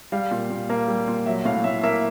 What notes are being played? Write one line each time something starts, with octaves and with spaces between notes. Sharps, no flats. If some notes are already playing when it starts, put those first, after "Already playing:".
G3 F5
A#2
A#2
A#3 F5
G3
A#2
F#3 E5
A2 F5
A2 E5
A#3 E5